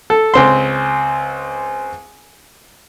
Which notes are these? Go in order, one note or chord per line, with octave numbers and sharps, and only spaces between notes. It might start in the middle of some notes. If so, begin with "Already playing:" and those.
A4
C#2 C4 C6